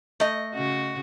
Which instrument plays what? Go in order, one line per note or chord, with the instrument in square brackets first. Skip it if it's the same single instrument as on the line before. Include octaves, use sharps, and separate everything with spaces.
[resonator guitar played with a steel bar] A3 D#5
[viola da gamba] C#3 F#4